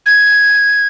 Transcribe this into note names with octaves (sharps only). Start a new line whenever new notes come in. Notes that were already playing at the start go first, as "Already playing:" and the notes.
G#6